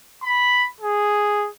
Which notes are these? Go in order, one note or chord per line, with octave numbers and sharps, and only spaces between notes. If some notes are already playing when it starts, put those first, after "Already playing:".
B5
G#4